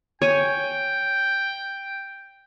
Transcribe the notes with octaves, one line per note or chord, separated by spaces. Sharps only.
C#5 G5 G#5